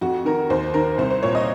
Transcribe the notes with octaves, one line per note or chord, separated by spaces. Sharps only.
F2 F#4
D#3 A#4
D#2 C5
D#3 A#4
C2 C5
C5
A#2 C#5
D#5